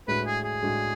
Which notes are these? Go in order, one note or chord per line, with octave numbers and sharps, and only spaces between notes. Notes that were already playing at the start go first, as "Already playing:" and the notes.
A2 G#3 D4 F#4 B4
G#4
G#4
A2 G#3 D4 F#4